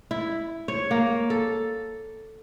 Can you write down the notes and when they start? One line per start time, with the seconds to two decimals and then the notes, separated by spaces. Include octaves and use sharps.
0.11 E4
0.68 C#5
0.91 A#3
1.30 A4